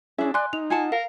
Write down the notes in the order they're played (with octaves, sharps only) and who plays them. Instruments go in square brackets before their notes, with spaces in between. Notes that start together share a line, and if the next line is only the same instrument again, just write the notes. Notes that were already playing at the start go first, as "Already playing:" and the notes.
[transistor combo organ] C#4 E4 G#4 [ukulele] D4 E5
[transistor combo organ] D5 [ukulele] G#5 [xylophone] C6 F#6
[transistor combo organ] D#4 [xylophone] F7
[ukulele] F4 F#5 A5 [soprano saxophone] G#5
[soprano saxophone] A#4 [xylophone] F5